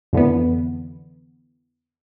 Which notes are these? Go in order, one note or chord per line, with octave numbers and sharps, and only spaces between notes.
F2 D3 E3 B3